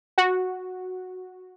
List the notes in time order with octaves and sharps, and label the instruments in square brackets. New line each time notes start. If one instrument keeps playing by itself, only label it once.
[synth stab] F#4